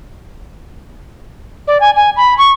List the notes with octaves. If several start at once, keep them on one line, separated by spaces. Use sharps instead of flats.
D5
G#5
G#5
B5
C#6